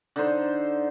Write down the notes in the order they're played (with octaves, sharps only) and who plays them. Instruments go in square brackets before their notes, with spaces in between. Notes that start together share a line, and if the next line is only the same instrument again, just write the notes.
[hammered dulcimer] D3 D#4 C5